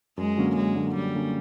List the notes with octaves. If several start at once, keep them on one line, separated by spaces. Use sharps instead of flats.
F#2 G#3
D3 F#3 A#3 C#4
F#2 G#3
D3 F#3 A#3 C#4
F#2 G3
D3 F#3 A#3 C#4